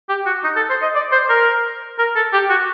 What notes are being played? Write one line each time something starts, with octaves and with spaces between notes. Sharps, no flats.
G4
F#4
D#4
A4
C5
D#5
D5
C5
A#4
A#4
A4
G4
F#4